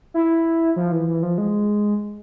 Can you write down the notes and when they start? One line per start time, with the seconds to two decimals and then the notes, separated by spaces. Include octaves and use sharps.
0.14 E4
0.76 F3
0.92 E3
1.08 E3
1.23 F3
1.38 G#3